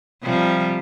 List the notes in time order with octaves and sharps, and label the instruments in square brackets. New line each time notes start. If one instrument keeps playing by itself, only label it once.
[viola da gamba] C3 F3 G3